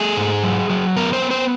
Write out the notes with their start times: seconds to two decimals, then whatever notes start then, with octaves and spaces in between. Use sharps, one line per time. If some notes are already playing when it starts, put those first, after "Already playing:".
Already playing: A3 G#4
0.17 G#2
0.43 F#3
0.69 F#3
0.96 B3 A#4
1.13 C5
1.22 B3
1.31 C5